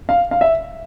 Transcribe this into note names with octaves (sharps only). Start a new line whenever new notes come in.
F5
F5
E5